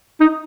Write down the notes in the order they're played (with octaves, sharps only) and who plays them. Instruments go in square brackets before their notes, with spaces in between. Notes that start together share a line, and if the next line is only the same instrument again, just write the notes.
[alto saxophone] D#4